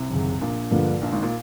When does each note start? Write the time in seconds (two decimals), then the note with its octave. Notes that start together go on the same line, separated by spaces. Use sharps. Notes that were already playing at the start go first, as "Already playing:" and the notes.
Already playing: C2 C3
0.10 G#1 F#2 C#3
0.41 A#1 A#2
0.71 G2 D3 F3 A#3
1.01 A#1 A#2
1.12 G#1 G#2
1.22 A#2